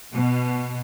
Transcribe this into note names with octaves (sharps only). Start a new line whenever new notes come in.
B2